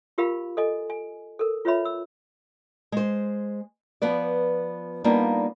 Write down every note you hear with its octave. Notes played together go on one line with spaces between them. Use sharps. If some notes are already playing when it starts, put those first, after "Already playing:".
F4 G4 A#4 F5 B5
A4 D#5 G#5
G#5
A4 A#4
F4 B4 C#5 E5 B5
E6
G#3 C5
F3 B3 B4 D5
G3 A#3 B3 D4 D#4 F4